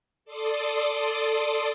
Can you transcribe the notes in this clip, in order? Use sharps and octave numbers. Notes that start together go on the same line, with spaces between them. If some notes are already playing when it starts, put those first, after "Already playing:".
A4 D5 C6 D6 D#6